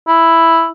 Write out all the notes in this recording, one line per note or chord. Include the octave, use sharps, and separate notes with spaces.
E4